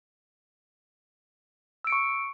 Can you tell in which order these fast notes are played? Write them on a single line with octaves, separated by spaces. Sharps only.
E6 D7 C#7 C#6